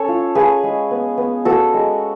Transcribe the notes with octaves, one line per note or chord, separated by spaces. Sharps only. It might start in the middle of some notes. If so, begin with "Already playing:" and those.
Already playing: C#4 A4 C#5
F4
F4 G#4 B4
G#3
B3
B3
B3 F#4 A4
G#3